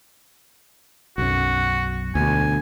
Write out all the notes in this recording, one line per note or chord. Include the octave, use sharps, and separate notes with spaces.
B1 F#2 F#4
D2 B2 G#5